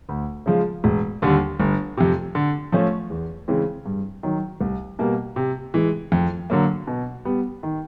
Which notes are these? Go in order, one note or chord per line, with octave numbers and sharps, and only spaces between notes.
D2
C#3 F3 G#3
E1
D#2 D3 G3
G1
F2 C3
D3
F3 A3 C#4
E2
C#3 E3 G#3 C4
G2
D#3 F#3
C2
B2 G3 A#3
C3
E3 G#3
F2
D3 F#3 A#3
B2
G3 B3
D#3